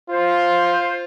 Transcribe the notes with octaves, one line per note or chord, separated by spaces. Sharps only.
F4 C5